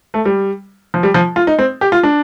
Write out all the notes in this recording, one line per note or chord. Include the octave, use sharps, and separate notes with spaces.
A3
G3
F3
G3
F3
F4
D#4
C4
G4
F4
D4